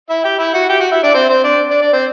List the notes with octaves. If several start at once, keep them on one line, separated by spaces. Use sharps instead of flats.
E4 E5
G4 G5
E4 E5
F#4 F#5
G4 G5
F#4 F#5
E4 E5
D4 D5
C4 C5
C4 C5
D4 D5
D4 D5
D4 D5
C4 C5